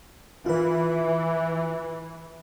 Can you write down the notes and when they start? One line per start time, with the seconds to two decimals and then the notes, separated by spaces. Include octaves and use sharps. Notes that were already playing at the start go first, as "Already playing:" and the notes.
0.46 E3 F4 B4